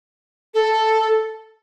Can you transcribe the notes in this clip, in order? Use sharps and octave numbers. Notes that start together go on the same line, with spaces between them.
A4